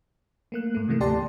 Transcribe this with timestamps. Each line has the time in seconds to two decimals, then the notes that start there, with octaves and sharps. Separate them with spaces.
0.52 A3 A#3 F#6
0.75 G#2 A3
0.88 C3 D#3 E3 A3 A#3
1.00 D2 G4 D5 A5 C6